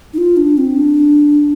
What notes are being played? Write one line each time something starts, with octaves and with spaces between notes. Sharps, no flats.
D#4
F4
D4
C4
D4